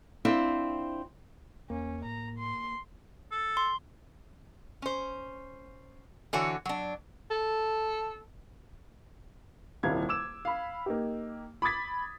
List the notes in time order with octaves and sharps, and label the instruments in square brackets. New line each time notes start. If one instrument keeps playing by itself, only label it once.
[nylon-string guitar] C4 D4 E4 F4
[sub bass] E2 [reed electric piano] A#3 [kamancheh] C#4
[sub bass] A2 [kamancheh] A#5
[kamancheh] C6
[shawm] A4
[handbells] C6
[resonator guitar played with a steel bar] C#4 C5
D3 E3 F#4 C#5
F#3 D4
[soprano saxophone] A4
[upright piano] D#1 C2 D#3 E4 F5 G#6
D6 E6 E7
F5 B5
A#3 D#4 G4
B5 D6 D#6 G#6 A6 B6